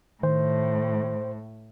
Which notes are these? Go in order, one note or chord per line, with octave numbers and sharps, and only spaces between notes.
A2 D#3 C5